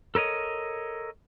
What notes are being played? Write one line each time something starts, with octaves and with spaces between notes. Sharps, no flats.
A4 A#4 C#5 D#5